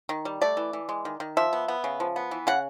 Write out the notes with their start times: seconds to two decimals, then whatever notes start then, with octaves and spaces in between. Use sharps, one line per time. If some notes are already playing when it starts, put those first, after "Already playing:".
0.09 D#3
0.25 G3
0.42 A3 D5
0.57 E3
0.73 E3
0.89 G#3
1.05 D#3
1.20 D#3
1.37 F3 E5
1.53 B3
1.68 B3
1.84 C#3
2.00 F3
2.16 B3
2.31 E3
2.47 C#3 F#5